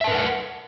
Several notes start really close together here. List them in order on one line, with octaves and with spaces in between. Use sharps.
E5 A5 B4 A#4 F#5